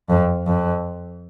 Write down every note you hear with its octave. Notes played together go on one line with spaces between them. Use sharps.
F2
F2